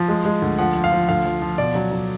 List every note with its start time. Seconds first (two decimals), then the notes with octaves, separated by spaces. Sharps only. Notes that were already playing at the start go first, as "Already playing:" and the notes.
Already playing: F3
0.08 G#3
0.25 G#3
0.42 D2
0.58 F3 F#5
0.75 F3
0.84 F5
0.92 F3
1.09 D2 F5
1.25 F3
1.42 F3
1.58 B2 D5
1.75 F#3
1.92 F#3